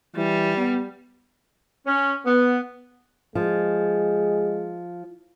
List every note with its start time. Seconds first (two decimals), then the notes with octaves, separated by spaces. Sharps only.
0.16 E3 G3
0.57 B3
1.86 C#4
2.25 B3
3.35 F3 G#3